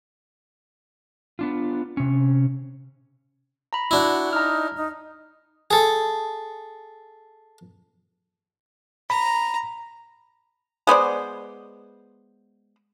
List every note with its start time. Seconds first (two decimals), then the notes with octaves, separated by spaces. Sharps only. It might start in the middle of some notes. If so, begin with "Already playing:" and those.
1.39 B3 D4 F4
1.97 C3 C#4
3.73 A#5 B5
3.91 D4 E4 F#4
4.33 D#4 A#5 F6
4.77 D#4
5.71 G#4 A4
9.10 A#5 B5
10.87 G#3 B3 C5 D5